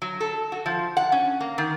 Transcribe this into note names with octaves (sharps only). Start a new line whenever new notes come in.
F#3
A4
F#4
F3
F#5
C#4
A#3
D#3